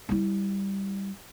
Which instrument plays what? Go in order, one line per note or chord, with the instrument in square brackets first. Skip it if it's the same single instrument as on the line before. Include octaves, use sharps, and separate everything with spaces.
[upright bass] G3 E4